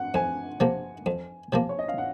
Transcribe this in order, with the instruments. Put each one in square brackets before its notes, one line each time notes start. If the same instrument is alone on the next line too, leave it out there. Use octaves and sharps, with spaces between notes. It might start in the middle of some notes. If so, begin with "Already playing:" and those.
Already playing: [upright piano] F#5
[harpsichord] F2 [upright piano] G#5
[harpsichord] C3 F3 A#3
F2
C3 F3 A#3
[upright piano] C#5
D#5
F5
F#5